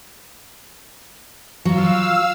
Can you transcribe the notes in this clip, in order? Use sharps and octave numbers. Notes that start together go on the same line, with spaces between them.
F#3 F4 F5 E6